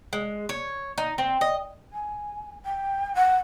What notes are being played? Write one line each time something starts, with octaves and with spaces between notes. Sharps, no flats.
G#3
C#5
D#4
C4
D#5
G#5
G5
F#5